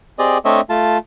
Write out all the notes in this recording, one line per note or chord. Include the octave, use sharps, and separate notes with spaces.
C4 G4 G#4 D5 D#5
A3 C4 D4 C#5 D#5 E5
A3 F4 A5